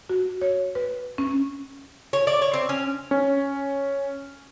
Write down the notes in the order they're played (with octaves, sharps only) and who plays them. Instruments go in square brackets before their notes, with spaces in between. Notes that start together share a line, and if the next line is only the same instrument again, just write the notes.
[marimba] F#4
C#5
B4
C#4
[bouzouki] C#5
D5
C#5
C4
C#4
[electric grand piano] C#4